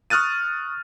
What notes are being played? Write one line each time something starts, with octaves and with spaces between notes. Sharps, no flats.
C#6 D#6 F6 F#6 A6 D#7